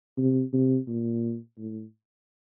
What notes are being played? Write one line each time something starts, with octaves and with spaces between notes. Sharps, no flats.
C3
C3
A#2
A2